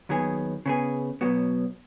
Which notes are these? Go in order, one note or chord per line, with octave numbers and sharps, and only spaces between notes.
D#2 D#3 F#3 B3 G#4
C#3 B3 G#4
B1 B2 F#3 B3 F#4